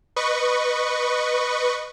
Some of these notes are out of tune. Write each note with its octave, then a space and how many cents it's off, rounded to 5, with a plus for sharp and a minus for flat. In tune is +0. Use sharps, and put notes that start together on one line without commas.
B4 +0 D#5 -20 C#6 +0